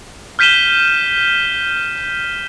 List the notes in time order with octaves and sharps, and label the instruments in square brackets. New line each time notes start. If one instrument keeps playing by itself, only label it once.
[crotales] F6 G6 B6 D#7 E7 G7